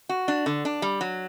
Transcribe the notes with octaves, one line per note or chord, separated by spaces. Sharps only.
F#4
D4
D3
D4
G3
F#3